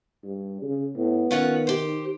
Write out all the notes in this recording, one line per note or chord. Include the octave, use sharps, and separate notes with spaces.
G2
C#3
A2 B3
D#3 C#4 F4 F#5
G4 C5